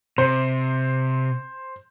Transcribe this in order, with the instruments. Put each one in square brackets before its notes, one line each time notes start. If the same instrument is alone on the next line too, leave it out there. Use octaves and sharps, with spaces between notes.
[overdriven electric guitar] C3 [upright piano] C5